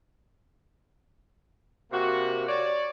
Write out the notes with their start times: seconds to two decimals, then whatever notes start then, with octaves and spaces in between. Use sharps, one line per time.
1.93 C3 A#3 F#4
2.48 C#5 D5